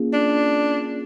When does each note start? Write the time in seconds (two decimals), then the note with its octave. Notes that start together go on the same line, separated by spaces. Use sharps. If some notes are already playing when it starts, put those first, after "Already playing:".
Already playing: A#3 C#4 F4 G#4
0.13 D4